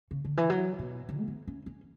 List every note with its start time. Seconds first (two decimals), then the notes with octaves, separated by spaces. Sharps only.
0.11 C#3
0.25 D3
0.37 E3
0.50 F#3
0.79 B2
1.09 C#3
1.18 A3
1.28 B3
1.48 C#4
1.66 C#4